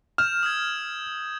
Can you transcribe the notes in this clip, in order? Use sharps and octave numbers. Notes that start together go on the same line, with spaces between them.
F6 G6 E7
D#6 E6 G#6